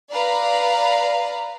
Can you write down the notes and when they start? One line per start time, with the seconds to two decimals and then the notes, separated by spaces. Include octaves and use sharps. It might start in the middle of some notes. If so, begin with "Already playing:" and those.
0.12 B4 D5 F5 A#5